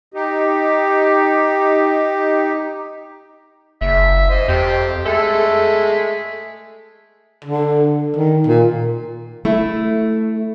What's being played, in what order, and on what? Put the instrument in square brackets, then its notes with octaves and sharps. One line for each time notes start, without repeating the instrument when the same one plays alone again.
[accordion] D#4 G4
[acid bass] F#1 [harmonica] E5
[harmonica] C5 D#5
[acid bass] F2 [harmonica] C4 G4
[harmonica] G#3 A3 E5 [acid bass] A4
[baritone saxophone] D3
D#3
A#2
[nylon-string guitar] A3 E4